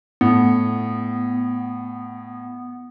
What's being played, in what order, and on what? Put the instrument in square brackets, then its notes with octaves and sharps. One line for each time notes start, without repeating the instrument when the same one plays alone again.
[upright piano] A2 [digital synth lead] B3